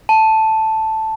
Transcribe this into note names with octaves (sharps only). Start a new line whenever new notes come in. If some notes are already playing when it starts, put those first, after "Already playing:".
A5